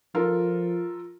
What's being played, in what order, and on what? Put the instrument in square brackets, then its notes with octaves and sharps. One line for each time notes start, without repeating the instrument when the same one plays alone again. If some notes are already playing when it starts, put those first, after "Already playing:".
[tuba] F3 [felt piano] F4 A4 A#4